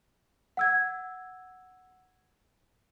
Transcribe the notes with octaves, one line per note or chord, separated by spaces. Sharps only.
F#5 E6 G#6